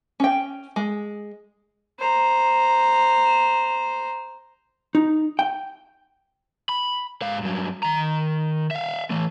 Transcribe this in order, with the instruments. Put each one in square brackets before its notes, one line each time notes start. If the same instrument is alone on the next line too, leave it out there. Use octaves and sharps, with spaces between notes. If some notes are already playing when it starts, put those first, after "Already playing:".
[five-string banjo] C#4 G5
G#3
[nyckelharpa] C5 A#5
[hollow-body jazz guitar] D#4
G5
[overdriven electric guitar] B5
G#2 F5
G2 F#3
D#3 A#5
E5 F5
E3 A3